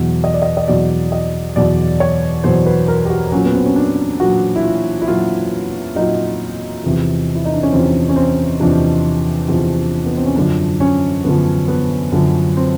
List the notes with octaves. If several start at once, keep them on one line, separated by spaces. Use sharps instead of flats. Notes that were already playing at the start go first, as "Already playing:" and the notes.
Already playing: E2 B2 F#3
D#5
D5
D#5
D#5
E2 B2 F#3 D5
D#5
E2 B2 F#3 D5
C#5
E2 B2 F#3 C5
B4
A#4
G4
F#4
A#2 F#3 C#4
B3
C4
C#4
D4
A#2 F#3 F#4
E4
F4
E4
A#2 F#3 F4
A#2 F#3 D#4
E2 C3 F3
E4
D#4
D4
C#4
E2 C3 F3 C4
C#4
C4
E2 C3 F3 D4
E2 C3 F3
B3
C4
C#4
F#2 D3 F3 D4
C#4
F#2 D3 F3 B3
B3
F#2 D3 F3
C4